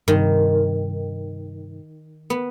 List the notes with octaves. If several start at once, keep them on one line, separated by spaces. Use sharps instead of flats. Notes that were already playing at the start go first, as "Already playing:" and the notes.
G2 C3 D#3
B3